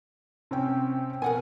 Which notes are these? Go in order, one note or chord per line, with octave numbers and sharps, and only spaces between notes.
C3 C#4 G5
B2 A#4 F#5 G#5